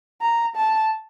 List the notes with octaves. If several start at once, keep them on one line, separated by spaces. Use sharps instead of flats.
A#5
A5